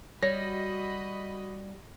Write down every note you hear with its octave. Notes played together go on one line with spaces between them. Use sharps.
G3 F#4 C#5 D#5 B5 A#6